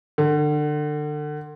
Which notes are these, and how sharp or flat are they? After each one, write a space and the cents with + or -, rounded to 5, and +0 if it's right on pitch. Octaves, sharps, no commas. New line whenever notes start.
D3 +30